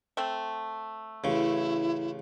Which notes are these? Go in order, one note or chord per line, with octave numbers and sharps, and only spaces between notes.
A3 C4
A1 C#3 E4